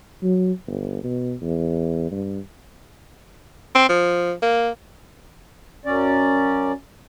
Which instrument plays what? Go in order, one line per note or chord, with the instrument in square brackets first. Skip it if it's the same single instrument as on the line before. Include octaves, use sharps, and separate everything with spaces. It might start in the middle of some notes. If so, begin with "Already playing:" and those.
[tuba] F#3
G1
B2
E2
G2
[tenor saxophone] C4
F3
A#3
[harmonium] F#2 C#4 D5